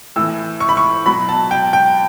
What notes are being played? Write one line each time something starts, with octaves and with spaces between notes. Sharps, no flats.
A2 E3 E6
C#6
B5
C#6
B2 F#3 B5
A5
G5
G5